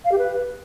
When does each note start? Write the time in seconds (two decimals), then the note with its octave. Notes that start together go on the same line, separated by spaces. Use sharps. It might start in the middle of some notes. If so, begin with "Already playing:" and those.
0.04 F5
0.11 G4
0.18 B4